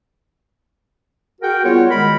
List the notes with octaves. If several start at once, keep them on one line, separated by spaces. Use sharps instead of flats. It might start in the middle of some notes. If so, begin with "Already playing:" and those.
F#4 G#4 A#4 F#5 G5
G3 B3 F4 C#5
D#3 G#3 A#4 B5